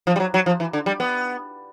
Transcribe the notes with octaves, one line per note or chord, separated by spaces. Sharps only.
F3
G3
F#3
F#3
F3
E3
D3
G3
B3